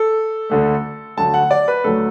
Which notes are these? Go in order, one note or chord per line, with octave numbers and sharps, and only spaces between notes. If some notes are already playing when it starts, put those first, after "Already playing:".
Already playing: A4
D2 D3 A3
D2 D3 F#3 A3 A5
F#5
D5
B4
D2 D3 F#3 A3 A4